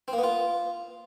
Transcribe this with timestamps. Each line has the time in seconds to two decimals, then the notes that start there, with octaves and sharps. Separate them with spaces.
0.08 C4
0.13 A#3
0.18 B3
0.23 F4